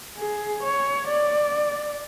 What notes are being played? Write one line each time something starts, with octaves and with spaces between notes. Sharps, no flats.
G#4
C#5
D5